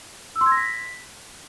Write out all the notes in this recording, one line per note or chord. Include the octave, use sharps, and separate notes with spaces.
E6
C6
G#6
A#6
B6